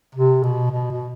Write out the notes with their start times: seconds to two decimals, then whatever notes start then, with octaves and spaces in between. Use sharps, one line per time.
0.15 C3
0.43 B2
0.72 B2
0.91 B2